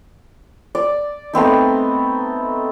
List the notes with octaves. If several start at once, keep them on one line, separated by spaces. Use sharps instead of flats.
D5
A3 B3 C4 D#4